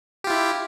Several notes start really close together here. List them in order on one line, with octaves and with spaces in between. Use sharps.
G4 F4 E4